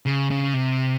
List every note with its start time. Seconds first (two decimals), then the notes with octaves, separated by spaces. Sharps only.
0.06 C#3
0.31 C#3
0.54 C3